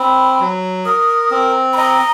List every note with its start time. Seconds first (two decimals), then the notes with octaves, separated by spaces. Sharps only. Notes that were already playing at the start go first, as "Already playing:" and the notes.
Already playing: C4 B5
0.40 F#3
0.85 A#4 D#6
1.31 C4
1.73 B5
1.77 D#5 A#5